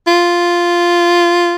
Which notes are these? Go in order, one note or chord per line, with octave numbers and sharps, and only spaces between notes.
F4